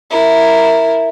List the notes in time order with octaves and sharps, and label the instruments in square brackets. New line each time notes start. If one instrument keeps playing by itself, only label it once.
[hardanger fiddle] E4 A#4